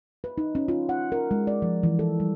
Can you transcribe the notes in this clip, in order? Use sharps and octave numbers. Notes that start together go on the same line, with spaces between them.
B4
D#4
C#4
F4
F#5
A#4
G#3
D5
F3
E3
A4
G3